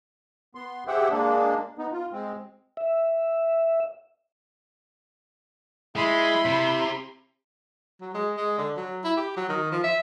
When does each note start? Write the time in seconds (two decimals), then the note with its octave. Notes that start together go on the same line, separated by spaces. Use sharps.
0.55 B3 C6
0.87 G4 G#4 C5 E5 F#5 G5
1.11 G#3 A#3 D4
1.78 B3 D#4
1.92 F4
2.12 G#3 C4
2.77 E5
5.96 G#3 E4 B5 C6
6.45 C3
8.01 F#3
8.14 G#3
8.37 G#3
8.58 D3
8.76 F#3
9.04 E4
9.17 G4
9.36 F#3
9.49 D#3
9.72 F3
9.84 E5